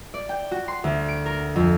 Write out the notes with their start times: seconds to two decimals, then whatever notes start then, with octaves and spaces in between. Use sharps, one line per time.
0.14 D5
0.29 G5
0.51 F#4
0.68 C6
0.84 D2
1.08 D7
1.26 A#4
1.56 F2